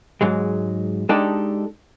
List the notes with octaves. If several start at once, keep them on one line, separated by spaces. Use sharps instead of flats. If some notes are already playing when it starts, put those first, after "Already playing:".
G#2 F#3 G#3
G#3 D4 D#4 G4 A4 D5